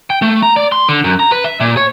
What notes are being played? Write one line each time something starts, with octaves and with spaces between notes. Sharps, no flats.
G5
A3
A#5
D5
C6
D3
F#2
A#5
B4
E5
A#2
C#5